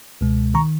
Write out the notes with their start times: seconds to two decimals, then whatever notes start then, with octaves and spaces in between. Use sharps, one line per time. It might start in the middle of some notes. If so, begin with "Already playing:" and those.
0.21 C#2 B2 G#3
0.54 D#3 A#5 C#6